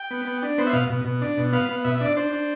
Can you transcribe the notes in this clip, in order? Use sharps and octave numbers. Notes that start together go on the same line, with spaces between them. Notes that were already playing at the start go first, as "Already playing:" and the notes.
Already playing: G5
B3
B3
D4
B3 C5
E5
B2 F5
B2
B2
D4
B2
B3 F5
B3
B2 E5
E5
D4 D5
D4 C5
D4